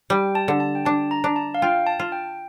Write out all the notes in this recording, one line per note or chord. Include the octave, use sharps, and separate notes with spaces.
G3 G5
A5
D3
A5
G5
D4 A5
A#5
D4
A5
F5
F4 G5
A5
F4
G5